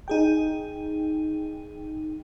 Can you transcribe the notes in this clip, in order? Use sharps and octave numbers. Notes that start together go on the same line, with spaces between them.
D#4 G#4 G5